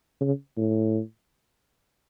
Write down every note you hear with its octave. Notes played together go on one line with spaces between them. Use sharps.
C#3
A2